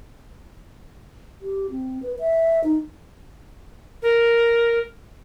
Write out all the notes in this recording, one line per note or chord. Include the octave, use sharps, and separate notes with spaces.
G4
C4
B4
E5
D#4
A#4